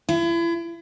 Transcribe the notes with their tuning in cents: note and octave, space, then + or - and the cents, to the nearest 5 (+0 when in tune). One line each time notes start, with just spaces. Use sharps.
E4 +35